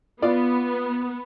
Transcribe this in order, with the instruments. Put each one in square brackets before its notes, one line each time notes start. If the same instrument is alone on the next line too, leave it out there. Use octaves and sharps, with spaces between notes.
[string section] B3 [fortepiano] F4 D5